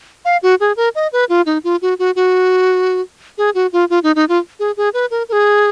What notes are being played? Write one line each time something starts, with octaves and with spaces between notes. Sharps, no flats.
F5
F#4
G#4
A#4
D#5
B4
F4
D#4
F4
F#4
F#4
F#4
G#4
F#4
F4
F4
D#4
D#4
F4
G#4
G#4
B4
A#4
A#4
G#4